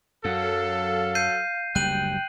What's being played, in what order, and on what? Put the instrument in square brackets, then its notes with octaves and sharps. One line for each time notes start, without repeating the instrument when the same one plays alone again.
[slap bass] F#2 [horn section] F#3 A4 [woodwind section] F5
[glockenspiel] G6 C7 D#7
[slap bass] F#1 D2 G3 [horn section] G5 [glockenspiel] F#6 D#7 F#7